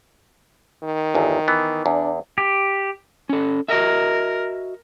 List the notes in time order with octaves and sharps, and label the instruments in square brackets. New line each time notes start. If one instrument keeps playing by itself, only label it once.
[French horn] D#3
[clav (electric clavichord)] G1 E2
E3 B3
[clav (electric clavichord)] E2 [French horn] D4
[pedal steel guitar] G4
[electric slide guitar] C#4 A4
[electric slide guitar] F#4 D#5 E5 [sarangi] A#4